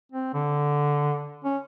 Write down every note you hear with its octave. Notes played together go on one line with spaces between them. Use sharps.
C4
D3
C#4